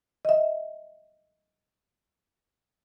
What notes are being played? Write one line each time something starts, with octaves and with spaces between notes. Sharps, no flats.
D#5 E5